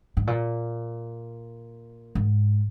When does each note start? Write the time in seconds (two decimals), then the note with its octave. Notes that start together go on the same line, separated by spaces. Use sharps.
0.17 G#2
0.27 A#2
2.15 G#2